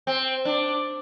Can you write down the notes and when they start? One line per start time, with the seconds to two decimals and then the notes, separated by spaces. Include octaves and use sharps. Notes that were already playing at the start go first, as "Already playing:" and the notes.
0.07 C4
0.45 D4